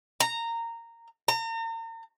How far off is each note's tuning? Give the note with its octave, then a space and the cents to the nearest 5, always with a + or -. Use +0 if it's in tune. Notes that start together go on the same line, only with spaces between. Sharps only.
A#5 -15
A#5 -40